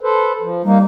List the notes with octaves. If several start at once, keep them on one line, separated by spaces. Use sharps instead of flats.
A4 B4 C5
F3
G3 A#3 D#4